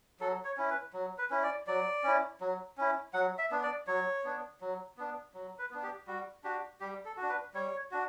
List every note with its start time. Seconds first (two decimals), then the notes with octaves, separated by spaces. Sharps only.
0.20 F#3 A4
0.45 C#5
0.57 C#4 E4
0.70 B4
0.93 F#3
1.18 B4
1.30 C#4 E4
1.43 D5
1.67 F#3 D5
2.04 C#4 E4
2.41 F#3
2.78 C#4 E4
3.14 F#3 F#5
3.38 E5
3.51 B3 D4
3.63 D5
3.87 F#3 C#5
4.24 B3 D4
4.61 F#3
4.97 B3 D4
5.34 F#3
5.59 B4
5.71 B3 D4
5.83 G4
6.07 G3 F#4
6.44 D4 F#4 G4
6.80 G3 G4
7.05 A4
7.17 D4 F#4
7.29 B4
7.54 G3 C#5
7.91 D4 F#4